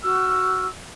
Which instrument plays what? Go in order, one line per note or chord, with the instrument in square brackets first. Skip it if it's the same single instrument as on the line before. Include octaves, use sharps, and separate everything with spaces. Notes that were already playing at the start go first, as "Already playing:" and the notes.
[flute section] F#4 E6 F6